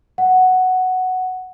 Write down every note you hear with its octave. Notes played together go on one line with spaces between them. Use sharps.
F#5